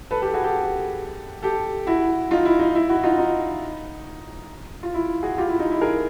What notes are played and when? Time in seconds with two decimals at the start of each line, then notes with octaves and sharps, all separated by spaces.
0.11 A4 B4
0.22 G4 A4
0.34 F#4 G#4
0.44 G4 A4
1.42 G4 A4
1.87 E4 F#4
2.31 D#4 F4
2.45 E4
2.59 D#4
2.75 E4
2.89 E4 F#4
3.03 D#4 F4
3.18 D#4
4.83 F4
4.94 E4
5.23 F#4 G#4
5.37 F4 G4
5.49 E4
5.59 D#4
5.71 E4
5.81 G#4 A#4